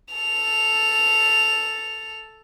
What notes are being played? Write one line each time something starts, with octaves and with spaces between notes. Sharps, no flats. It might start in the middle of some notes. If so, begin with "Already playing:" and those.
A4 F7